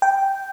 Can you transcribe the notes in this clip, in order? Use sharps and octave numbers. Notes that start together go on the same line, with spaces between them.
G5